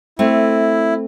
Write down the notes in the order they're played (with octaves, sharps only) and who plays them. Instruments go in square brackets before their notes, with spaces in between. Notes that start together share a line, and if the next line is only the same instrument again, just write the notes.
[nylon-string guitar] A3 C4 [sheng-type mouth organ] E4